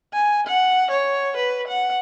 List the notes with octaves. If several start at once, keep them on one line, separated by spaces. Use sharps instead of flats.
G#5
F#5
C#5
B4
F#5